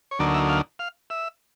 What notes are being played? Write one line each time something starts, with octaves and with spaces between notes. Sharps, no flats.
C#5
D2 D3 F#3 A#3 D#4 D5
E5
F5
F5
E5